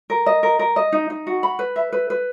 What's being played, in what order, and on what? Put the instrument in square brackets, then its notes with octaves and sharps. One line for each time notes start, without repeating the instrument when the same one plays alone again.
[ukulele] A#4
D#5
A#4
A#4
D#5
D#4
D#4
F#4
B5
B4
E5
B4
B4